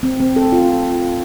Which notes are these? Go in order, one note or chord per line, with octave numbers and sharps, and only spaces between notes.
C4
C4
A4
F4